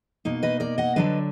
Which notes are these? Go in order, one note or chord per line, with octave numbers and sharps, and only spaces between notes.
B2 A#3 D#4
B4 D#5
A#4 D5
D#5 F#5
D3 F#3 D4 B4 D#5